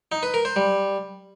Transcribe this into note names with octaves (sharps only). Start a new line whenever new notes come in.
D#4
B4
A#4
C5
G3